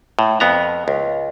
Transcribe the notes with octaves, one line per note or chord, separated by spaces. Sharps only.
A2
F2 B3 A#5
C#2